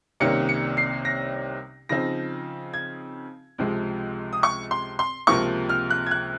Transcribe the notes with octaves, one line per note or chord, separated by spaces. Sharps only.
C2 C3 D#3 A#3 C#4 C#7
C#7
C7
A#6
C#3 F3 C4 D#4 A#6
G#6
C#2 C3 F3 G#3
D#6
C#6
C6
C6
C#2 C3 F3 A#3 C#6
F6
F#6
G#6
F#6